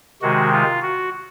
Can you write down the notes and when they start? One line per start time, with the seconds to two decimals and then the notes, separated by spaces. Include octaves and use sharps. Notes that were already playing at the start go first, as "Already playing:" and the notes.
0.22 C3 D#3 G#3 F#4
0.52 F4
0.82 F#4